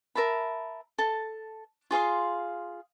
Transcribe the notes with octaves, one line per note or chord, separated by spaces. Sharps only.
A#4 E5 A5 B5
A4 A5
F4 G#4 F5 C6